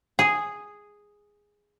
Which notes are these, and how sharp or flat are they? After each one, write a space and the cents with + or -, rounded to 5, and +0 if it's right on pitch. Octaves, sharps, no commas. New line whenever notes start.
G#4 -5